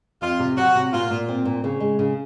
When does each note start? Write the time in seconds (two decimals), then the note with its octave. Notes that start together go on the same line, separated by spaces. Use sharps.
0.22 F2 F4
0.39 C3
0.57 F#3 F#4
0.75 C3
0.93 A#2 F4
1.10 A#2
1.29 C4
1.45 A#2
1.64 C#3
1.80 G#3
1.99 C#3